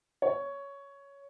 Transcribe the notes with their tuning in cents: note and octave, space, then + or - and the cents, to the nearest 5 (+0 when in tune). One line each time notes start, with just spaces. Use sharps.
C#5 +10